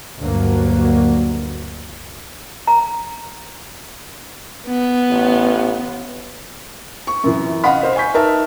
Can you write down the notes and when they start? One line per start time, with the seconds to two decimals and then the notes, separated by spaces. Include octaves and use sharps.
0.18 D2 G2 D3 F#3 A#3
2.67 A#5
4.67 B3
5.11 A1
7.07 C#6
7.24 F#2 C3 E3
7.64 D#5 F5 F#5 B5
7.83 C5 D#5 F5
7.96 G#5 C#6 G6 B6
8.14 D#4 A#4 B4 D#5 E5 A5